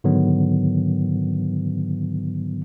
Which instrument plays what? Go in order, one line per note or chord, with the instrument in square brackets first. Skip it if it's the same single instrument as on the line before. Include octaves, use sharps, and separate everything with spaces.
[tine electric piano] G#2 D3 D#3 F#3 B3